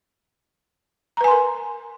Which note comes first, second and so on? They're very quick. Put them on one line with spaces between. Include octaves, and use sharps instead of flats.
A#5 B4 G#5 C6 A#4